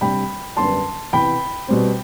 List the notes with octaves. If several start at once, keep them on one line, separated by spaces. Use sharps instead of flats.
C3 G3 D4 G5 B5
F#2 D3 G3 B3 D4 A5 C6
C3 E3 B3 G5 B5
B2 G3 C4